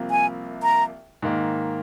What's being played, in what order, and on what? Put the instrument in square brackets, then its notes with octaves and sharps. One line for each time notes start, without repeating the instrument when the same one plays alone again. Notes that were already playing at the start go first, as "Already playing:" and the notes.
Already playing: [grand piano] C2 C3 F3 A#3
[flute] G#5
A#5
[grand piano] G#2 D#3 A#3